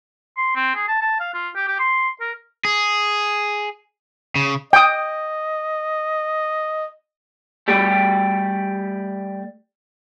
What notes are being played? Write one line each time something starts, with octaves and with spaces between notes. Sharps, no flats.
C6
C4
G#4
A5
A5
F5
F4
G4
G4
C6
A#4
G#4
C#3
D#5 G5 D#6
G3 A3 G4